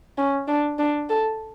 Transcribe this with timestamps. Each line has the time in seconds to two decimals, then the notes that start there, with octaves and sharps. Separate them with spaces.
0.18 C#4
0.48 D4
0.79 D4
1.09 A4